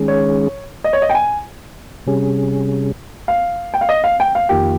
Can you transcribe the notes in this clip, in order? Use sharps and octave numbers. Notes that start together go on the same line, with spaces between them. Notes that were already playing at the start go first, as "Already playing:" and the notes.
Already playing: D#3 G#3 C#4 G#4
C#5
D#5
C#5
D#5
G5
G#5
C3 G3 C#4 G#4
F5
G5
F5
D#5
F5
G5
F5
F2 D#3 A#3 F4 G4